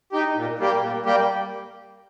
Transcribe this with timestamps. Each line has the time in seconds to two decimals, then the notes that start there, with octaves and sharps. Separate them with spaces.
0.12 D#4 G4
0.36 A#2
0.59 G3 A#3 G4
0.82 A#2
1.06 G3 A#3 G4